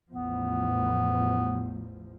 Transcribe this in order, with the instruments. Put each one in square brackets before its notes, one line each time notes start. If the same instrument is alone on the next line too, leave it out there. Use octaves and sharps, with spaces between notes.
[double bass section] A1 E2 F3 [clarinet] B3